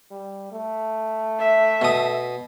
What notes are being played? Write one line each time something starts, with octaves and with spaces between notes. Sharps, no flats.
G3
A3
E5
B2 D#6